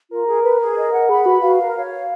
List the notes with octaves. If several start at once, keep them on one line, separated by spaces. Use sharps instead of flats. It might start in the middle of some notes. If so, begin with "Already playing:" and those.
F4 A#4
G#4
B4
G#4
D#5
F#5
G#4 B5
F#4 B4
F#4 F5
A#4
C#5
F5